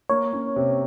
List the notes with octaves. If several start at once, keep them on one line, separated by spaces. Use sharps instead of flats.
A#3 C#5
C#4
C3